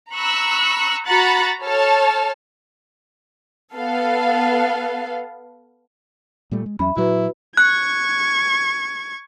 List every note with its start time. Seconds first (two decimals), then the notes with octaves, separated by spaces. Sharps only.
0.12 A#5 B5 C#6 E6 F#6
1.06 F#4 A#5 B5 F#6 A6 C#7
1.62 A4 C#5 A5 F6
3.74 B3 A4 F5
6.51 A#2 G3 A3
6.66 G#3
6.79 E2 F#3 C#4 E5 B5
6.97 A#2 F#3 E4 F#4 B4
7.57 C#6 F#6 G#6